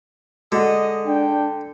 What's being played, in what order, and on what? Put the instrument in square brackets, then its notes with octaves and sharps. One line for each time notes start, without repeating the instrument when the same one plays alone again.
[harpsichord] D3 [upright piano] G#3 F#4 [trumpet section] D#5
[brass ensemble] D4 [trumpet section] G5